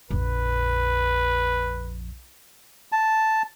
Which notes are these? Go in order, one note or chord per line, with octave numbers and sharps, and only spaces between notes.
A#1 F2 B4
A5